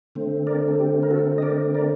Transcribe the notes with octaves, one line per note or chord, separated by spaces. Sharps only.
D3 A3 C4
A#4 D5
A4
G4
A#4
F#4 A4
D#5
A#4 D5
A#4 D5